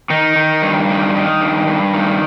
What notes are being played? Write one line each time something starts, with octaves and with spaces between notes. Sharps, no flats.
D#3 D#4
D#3
G2
D#3
D#3
G2
G2
D#3